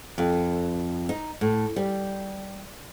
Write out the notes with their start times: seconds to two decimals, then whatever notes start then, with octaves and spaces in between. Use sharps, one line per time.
0.18 F2
1.09 D#4
1.41 A2
1.76 G3